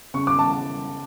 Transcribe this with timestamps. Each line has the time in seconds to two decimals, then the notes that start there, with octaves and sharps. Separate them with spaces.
0.14 C#3 C#6
0.27 D6
0.39 A5